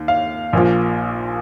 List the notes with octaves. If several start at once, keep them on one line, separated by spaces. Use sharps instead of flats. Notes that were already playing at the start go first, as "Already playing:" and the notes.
Already playing: D#2
F5
A#1 A#2 F3